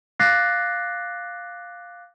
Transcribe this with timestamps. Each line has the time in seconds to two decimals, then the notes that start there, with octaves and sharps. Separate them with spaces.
0.19 F5 D6 F#6 A6 A#6 C7